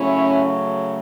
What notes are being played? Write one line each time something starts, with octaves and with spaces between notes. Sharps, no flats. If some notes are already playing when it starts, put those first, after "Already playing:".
Already playing: C#3 F#3 A3 C#4 E4